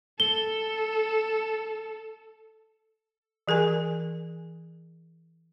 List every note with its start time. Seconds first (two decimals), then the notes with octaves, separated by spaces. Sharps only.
0.20 A4 G7
3.48 E3 G#4 A#4 G#5